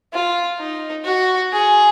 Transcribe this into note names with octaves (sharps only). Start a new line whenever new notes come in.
F4
D#4
F#4
G#4